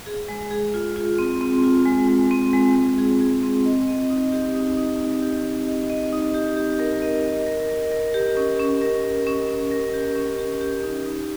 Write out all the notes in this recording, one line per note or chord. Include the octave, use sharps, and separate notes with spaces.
G#4
G#3
G#4
F4
F4
C4
C4
F4
G#3
G#3
C4
G#3
G#3
G#4
G#4
C4
D#5
D#5
D#4
G4
D#4
D#4
D#5
G4
G4
D#5
D#5
D#4
G4
G4
A#4
D#5
A#4
A#4
A#4
A#4
G4
C#4
C#4
A#4
C#4
C#4
C#4
A#4
G4
C#4
G4
G4
D#4
D#4